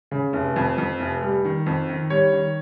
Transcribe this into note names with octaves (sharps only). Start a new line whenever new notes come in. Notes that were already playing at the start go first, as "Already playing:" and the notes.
C#3
F1
F2
F2
F1
G3
D#3
F2
D#3
G3 C#5
D#3